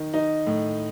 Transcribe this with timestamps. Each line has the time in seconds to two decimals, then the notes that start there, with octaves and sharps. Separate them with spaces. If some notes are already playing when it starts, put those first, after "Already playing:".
Already playing: D#3
0.14 D#4
0.47 A2